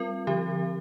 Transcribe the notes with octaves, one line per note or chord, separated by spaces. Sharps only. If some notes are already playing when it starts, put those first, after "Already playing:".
Already playing: G3 C4 F4 A#4
D3 F3 C4 G4